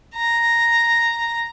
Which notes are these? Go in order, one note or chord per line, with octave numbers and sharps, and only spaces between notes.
A#5